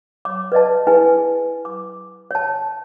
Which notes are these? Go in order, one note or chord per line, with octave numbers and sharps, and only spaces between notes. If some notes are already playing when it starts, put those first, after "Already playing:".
C#5 D6
B4 D5 D#5 A5
E4 G#4 B4 G#5
D6
C#5 A5